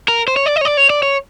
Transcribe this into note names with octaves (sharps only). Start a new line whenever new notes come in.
A#4
C5
C#5
D5
D#5
C#5
D5
C#5
D5
C#5